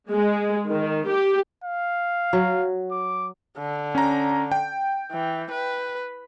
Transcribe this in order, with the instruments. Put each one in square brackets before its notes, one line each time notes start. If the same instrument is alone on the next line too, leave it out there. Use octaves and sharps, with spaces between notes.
[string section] G#3
D#3
G4
[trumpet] F5
[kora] F#3
[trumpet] D6
[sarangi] D3
[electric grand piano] C#4 A#5
G5
[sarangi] E3
B4